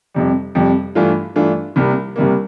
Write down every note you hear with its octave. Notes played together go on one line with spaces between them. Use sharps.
F2 C3 G3
F2 C3 G3
G2 E3 A3 D4 F4
G2 E3 A3 D4 F4
C2 C3 G3 A#3
C2 C3 G3 A#3